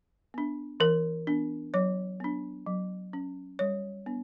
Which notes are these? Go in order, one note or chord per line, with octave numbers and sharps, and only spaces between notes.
B3 D4
E3 A#4
B3 D4
F#3 C#5
B3 D4
F#3
C#4
G3 C#5
B3 D4